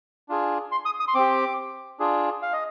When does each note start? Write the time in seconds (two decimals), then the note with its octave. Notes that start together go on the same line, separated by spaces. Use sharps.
0.29 D4 F4 G#4
0.72 C6
0.86 D#6
1.00 D#6
1.08 C6
1.15 C4 G4 D6
2.00 D4 F4 G#4
2.42 F5
2.53 D#5